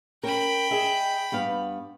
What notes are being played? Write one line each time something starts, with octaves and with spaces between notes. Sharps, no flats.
C#4 A#4 G5 B5
G#4 D#5 E5
G2 B3 F5